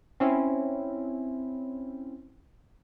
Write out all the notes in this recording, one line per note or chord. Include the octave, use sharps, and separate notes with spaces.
C4 C#4 E4